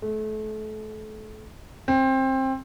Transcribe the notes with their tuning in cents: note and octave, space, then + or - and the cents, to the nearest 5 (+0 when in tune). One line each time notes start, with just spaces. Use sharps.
A3 -30
C4 +20